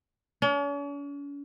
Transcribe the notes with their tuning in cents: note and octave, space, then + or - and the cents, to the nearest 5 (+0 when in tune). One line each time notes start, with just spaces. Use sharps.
C#4 +45